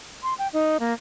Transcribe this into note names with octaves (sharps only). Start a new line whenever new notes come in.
C6
G5
D#4
A#3